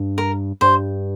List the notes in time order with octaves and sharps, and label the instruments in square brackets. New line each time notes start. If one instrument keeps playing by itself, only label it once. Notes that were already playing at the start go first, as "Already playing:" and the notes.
Already playing: [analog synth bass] G2
[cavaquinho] A#4
[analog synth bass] G2 [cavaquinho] C5